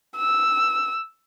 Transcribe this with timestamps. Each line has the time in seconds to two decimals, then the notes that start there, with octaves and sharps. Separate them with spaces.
0.17 E6